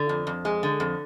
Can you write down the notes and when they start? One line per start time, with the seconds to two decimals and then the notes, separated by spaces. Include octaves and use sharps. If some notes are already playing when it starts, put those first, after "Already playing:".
Already playing: D3
0.09 F2
0.27 F2
0.45 G#3
0.63 D3
0.80 F2